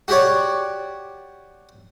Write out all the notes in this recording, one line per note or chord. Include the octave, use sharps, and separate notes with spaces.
F#4 G4 C#5 D5